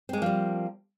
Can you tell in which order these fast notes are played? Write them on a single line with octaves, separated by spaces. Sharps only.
C4 G#3 A#3 F3 G3